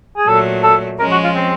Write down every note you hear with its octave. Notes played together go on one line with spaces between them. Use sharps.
G#4
A#2 F#3 A3 A4
A4
F3 G#3 C#4 A#4
F#4
F4
C4